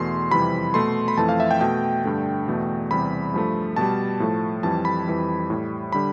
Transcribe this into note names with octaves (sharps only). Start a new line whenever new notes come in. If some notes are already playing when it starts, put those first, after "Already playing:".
Already playing: E2 B2 A3 C6
F2 C3 E3 G3 B5
B2 A3 C6
B5
F2 E3 A3 A5
F5
E5
G5
B2 A3 G5
G2 D3 A3
E2 B2 A3
E2 C3 G3 B5
G2 F3 A3
B2 G3 A5
A2 F3 A3
F2 E3 G3 A5
B5
F2 E3 G3
A2 G3
D3 G3 B5